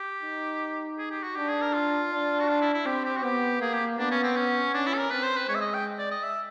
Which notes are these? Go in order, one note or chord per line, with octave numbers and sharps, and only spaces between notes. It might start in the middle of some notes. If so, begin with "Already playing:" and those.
Already playing: G4
D#4
G#4
G4
F#4
D4 G4
G#4
A#4
F4
D4
F#4
F4
E4
E4
C4 G4
G4
F#4
B3 G4
A#3 G#4
G4
B3 D4
C#4
C4
C#4
C#4 D4
E4
A4
A#4
C4 B4
C5
B4
G#3 C#5
E5
D#5
G5
D5
D#5
E5